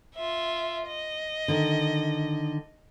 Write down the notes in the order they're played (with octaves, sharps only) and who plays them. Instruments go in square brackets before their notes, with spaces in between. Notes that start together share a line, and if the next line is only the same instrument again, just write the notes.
[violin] F4 E5
D#5
[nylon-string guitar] D3 D#3